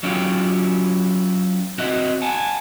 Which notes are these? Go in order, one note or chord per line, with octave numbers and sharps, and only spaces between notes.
F#3 C#4 E4 F4 G4
C4 F#4 D#5 E5 F#5
F#5 G#5 A5